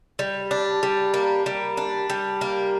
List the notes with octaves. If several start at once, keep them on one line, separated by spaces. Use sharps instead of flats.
G3
D4
G3
A#3
G3
D4
G3
A#3